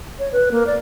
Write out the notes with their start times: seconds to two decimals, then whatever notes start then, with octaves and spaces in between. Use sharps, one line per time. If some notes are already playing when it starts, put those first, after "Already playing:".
0.19 C#5
0.32 B4
0.51 A#3
0.67 D5